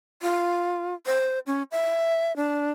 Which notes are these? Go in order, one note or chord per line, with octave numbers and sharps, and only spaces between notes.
F4
C5
C#4
E5
D4